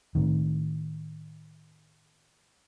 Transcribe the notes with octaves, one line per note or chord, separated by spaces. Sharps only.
A2 D#3